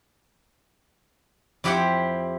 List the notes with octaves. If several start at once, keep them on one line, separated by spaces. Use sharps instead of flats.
F2 E4 G4 C5 F#5 G5